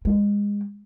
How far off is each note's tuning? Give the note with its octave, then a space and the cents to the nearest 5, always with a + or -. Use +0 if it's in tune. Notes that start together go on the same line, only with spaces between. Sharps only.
G#3 -25